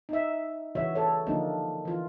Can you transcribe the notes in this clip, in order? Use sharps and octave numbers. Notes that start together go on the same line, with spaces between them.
D#4 E5
C#3 E3 G3 F#4 C#5 E5
A4 C#5
D3 F3 G3 A#3 D4 D#4
E3 F4